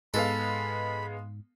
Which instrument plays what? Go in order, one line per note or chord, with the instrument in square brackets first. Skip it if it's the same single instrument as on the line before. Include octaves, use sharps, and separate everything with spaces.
[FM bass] G#2 [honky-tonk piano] G#3 B3 F5 [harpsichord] A4 [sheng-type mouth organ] B5